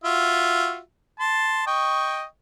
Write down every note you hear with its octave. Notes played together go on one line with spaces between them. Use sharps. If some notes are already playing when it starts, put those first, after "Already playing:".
F4 F#4 E5
A5 C6
D#5 G5 C#6